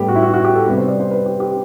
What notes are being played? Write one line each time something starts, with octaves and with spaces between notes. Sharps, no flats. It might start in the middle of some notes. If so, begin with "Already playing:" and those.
Already playing: A2 G3 B3 G4
F#4
E4
F#4
F#4
G4
A4
C3 G3 B3 B4
C5
D5
C5
B4
G4
G4